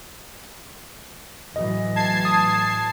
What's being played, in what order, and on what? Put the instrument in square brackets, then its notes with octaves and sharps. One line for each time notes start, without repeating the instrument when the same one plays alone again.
[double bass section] A2 E3 F#3 [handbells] D#5
[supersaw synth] A5 G#6 C7
[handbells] D#6